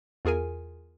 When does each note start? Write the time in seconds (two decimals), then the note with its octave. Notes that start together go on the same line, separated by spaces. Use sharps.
0.25 E2 F4 G#4 A#4 G#5